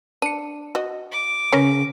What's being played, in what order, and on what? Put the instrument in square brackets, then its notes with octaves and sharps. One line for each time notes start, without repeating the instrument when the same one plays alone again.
[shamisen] D4 [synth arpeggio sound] C#7 D#7
[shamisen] F#4 D#5
[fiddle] D6
[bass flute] C#3 [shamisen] C#4 [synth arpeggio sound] A#4 B4 C#5